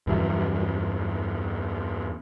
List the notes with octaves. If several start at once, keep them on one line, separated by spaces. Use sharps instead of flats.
E2 G2 E3 F#3